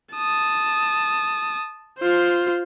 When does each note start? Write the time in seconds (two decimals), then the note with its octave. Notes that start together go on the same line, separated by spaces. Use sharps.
0.15 A5 D#6
1.99 F4 C5